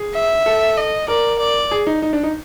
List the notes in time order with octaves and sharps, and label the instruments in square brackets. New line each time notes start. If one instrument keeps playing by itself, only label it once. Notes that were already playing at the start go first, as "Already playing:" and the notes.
Already playing: [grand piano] G#4
[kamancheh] E5
[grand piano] A4
[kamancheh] D#5
[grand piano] A#4 [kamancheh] D5
[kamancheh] D5
[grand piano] G#4
D#4
D#4
D4
D#4